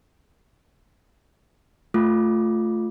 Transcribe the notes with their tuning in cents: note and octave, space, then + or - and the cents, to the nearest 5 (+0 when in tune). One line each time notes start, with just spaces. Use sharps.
A3 +0 F4 +0 D6 +0